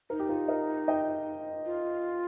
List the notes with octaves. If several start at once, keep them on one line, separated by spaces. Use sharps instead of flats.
D#4 A#4
G4
F4 A#4
A#4 D#5
D#5 G5
F4